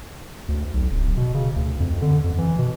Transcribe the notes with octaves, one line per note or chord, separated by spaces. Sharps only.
D2
B1
D1
B2
C#3
D2
F2
D3
F2
E3
B2